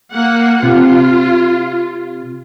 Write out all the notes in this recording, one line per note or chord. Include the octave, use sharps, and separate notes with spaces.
A#3 F#5
C3 F4